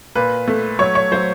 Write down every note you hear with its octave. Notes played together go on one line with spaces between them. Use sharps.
A#2 B4
A3
F#3 C#5
C#5
F#3 C5